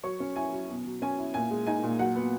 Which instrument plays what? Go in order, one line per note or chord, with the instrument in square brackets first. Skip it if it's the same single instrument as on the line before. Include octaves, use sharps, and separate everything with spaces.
[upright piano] F#3 C#5 C#6
C#4
E4 G#5
F#3
B2
F#3
C#4 G#5
E4
A#2 G#5
G#3
D#4 G#5
A#2
F#3 F#5
B3